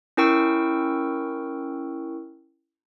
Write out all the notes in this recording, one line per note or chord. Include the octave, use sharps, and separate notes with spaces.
C#4 E4 A#4 G5 C#6 E6